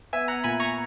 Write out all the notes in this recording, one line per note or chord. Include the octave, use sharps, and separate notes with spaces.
B3 E5 G#5
F#5 A#5
A#2 G#5 B5
A#5 C#6